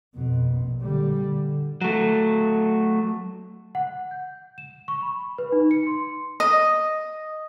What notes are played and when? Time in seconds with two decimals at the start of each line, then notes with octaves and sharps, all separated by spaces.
0.14 F2 B2
0.51 A#1
0.80 D3 G3
1.20 D3
1.81 F#3 A3
3.75 F#5
4.11 G6
4.58 E7
4.88 C#6
5.02 B5
5.38 B4
5.52 D#4
5.71 C#7
5.87 C6
6.40 D#5